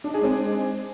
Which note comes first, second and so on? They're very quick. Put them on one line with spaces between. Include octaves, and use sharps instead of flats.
D4 D#4 G#4 G#3 C4